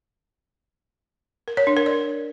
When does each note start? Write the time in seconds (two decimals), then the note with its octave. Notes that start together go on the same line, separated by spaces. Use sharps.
1.48 A#4
1.57 C#5
1.67 D4
1.77 A#4
1.86 D5